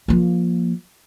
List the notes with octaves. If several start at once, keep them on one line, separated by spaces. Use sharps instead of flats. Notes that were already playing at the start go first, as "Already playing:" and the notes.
F3 A#3